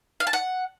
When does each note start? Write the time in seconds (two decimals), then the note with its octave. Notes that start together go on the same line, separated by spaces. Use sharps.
0.20 F5
0.27 A5
0.33 F#5